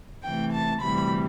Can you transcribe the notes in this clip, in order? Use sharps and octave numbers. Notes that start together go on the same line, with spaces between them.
C3 E3 A3 G5
A5
D2 C3 E3 G3 B5